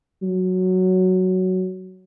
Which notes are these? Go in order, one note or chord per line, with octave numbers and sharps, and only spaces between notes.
F#3